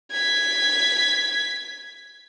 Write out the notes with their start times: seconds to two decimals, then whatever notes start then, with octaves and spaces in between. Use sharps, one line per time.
0.12 G#6 B6